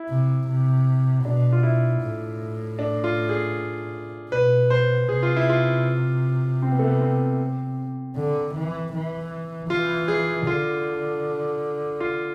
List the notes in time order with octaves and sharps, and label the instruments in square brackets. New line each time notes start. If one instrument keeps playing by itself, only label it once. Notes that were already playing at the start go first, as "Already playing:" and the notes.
Already playing: [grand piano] E4
[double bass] C3
C3
[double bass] B2 [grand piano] D4
[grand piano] F4
E4
[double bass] A2
[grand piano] D4
F4
G#4
[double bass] B2 [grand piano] B4
[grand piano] C5
[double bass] C3 [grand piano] G#4
[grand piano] F4
E4
F4
C4
B3
A3
B3
C4
[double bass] D3
E3
E3
[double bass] E3 [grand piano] F4
[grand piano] G#4
[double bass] D3 [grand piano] F4
[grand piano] F4